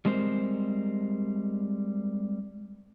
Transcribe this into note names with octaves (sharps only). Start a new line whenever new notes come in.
G3 G#3 C4 A#4 C5